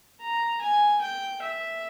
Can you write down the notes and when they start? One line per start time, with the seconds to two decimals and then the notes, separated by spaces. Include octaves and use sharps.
0.22 A#5
0.61 G#5
1.01 G5
1.42 E5